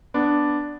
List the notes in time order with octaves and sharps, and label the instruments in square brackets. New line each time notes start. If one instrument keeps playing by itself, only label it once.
[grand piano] B3 D4